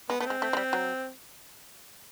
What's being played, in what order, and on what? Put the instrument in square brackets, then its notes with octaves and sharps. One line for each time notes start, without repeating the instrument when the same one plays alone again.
[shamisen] G#3 [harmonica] B3
[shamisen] A3 [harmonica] B3
[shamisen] G#3 [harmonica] C4
[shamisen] A3
G#3
G3
F#3